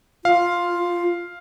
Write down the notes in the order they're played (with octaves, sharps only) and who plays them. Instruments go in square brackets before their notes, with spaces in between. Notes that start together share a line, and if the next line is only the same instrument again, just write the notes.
[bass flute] F4 [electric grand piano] F5